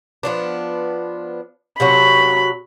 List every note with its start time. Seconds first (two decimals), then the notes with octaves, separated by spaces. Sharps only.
0.23 F3 B3 D4
1.80 C3 F#3 F#4 B5